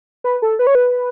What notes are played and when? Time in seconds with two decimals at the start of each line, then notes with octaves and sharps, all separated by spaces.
0.24 B4
0.42 A4
0.59 B4
0.67 C#5
0.75 B4